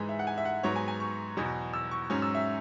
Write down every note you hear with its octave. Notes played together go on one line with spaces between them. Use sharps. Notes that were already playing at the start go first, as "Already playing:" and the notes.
Already playing: G#2 E3 G#3
E5
F#5
G#5
E5
F#5
G#2 F#3 B3 C#5
G#5
G#5
C#6
E2 B2 F#3
E6
C#6
G#2 F#3 C#4
E6
E5